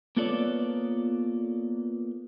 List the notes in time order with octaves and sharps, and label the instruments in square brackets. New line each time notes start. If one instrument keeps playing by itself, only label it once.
[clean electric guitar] A#3 B3 F4 A4 C#5 D5